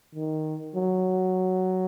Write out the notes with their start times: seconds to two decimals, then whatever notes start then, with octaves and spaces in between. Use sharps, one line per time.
0.15 D#3
0.75 F#3